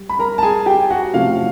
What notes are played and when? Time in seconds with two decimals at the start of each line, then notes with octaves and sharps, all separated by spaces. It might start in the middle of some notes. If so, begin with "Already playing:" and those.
Already playing: G3
0.09 B5
0.19 A#4 A#5
0.38 A5
0.43 G#4 G#5
0.66 G4 G5
0.90 F#4 F#5
1.13 C3 F3 A3 C#4 E4 F4 F5